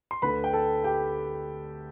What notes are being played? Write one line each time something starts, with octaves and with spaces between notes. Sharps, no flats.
C6
D2 D3 A3 B4 B5
G5
A4 A5
G4 G5